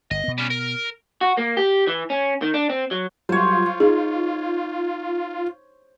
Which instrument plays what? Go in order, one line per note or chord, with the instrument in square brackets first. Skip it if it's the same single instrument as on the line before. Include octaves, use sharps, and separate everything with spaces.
[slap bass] G1 [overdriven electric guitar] D#5
[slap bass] B2 B3
[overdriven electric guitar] G3 C#4
A#4
[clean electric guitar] F#4
A#3
G4
E3
C#4
D#3
D4
C4
F#3
[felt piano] F#3 G3 [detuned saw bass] F4 [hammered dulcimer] C5 C#5
[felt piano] D#4 [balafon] G#4